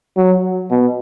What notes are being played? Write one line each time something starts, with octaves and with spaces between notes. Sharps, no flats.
F#3
B2